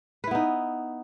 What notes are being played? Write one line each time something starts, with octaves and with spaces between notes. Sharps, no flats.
B3 D#4 E4 B4